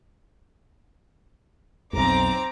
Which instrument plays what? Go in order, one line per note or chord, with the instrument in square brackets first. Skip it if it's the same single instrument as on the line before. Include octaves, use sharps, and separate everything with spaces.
[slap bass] B1 F2 [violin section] C4 A#5 D6